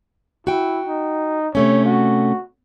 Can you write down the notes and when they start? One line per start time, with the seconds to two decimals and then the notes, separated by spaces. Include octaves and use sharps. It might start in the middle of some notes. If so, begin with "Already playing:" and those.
0.47 E4 F#4 G5
0.86 D#4
1.55 C3 A3 C#4 C#5
1.85 F#4